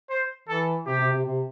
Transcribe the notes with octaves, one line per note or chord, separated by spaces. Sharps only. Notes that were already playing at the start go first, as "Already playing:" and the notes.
C5
E3 A4
C3 G4
C3
C3
C3